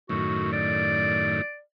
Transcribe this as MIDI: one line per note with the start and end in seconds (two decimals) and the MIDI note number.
0.09 1.42 42
0.09 1.42 45
0.09 1.42 51
0.09 0.50 66
0.53 1.60 74